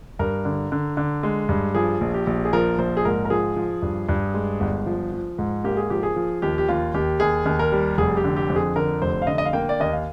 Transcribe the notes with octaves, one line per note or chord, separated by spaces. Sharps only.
G2 A#4
D3
D3
D3
G#3
G2
F3 G#4
A#1
G4
A#1
G#4
F3 A#4
A#1 C5
G#4
G#2 A#4
A#4
F3 G#4
F3
G2
G2
G#3
G1
F3
F3
G#2
A#3 G4
G#4
F3 G4
G#4
F3
D#2 G4
G4
D#2 F4
D#2 G4
D#2 G#4
D#2
A#4
G3
F1 G#4
G4
D3
G4
F2
G#4
D3 A#4
F1 C5
F5
D3 D#5
D#5
F5
A#3 G5
D5
D#2 D#5
F5